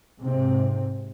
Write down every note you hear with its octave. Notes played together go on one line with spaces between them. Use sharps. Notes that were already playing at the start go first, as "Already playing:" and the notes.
G#2 C3 C4